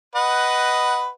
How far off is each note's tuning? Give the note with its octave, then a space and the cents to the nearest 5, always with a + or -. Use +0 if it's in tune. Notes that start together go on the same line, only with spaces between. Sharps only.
B4 +5 D#5 +0 F#5 +10